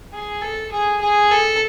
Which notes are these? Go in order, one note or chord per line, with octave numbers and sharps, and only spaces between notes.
G#4
A4
G#4
G#4
A4